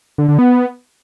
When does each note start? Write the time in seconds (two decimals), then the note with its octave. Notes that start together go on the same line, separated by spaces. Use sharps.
0.18 D3
0.28 D3
0.39 B3